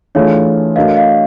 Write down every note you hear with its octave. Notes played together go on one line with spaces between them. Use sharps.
E3 A3 D4 F4 G#4 C#5
A3 D4 F#4 A#4 D#5 F5
D#5 F5